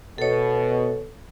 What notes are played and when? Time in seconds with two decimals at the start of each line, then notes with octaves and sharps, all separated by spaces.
0.18 B2 A4 C#5